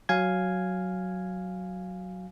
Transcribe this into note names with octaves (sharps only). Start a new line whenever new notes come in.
F#3 F5 G#5 G#6